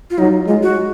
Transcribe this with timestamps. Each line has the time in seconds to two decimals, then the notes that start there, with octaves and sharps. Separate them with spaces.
0.10 F4
0.18 F#3 D#4
0.47 G#3 F4
0.63 F#4